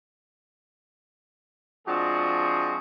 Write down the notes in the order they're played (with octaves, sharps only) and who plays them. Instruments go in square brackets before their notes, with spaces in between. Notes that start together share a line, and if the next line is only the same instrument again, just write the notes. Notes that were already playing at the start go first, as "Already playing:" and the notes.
[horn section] F3 G#3 C4 D4 F#4 G#4